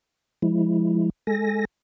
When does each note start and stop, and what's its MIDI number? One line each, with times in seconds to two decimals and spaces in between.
0.42 1.10 53
0.42 1.10 56
0.42 1.10 64
1.27 1.65 56
1.27 1.65 69
1.27 1.65 80
1.27 1.65 94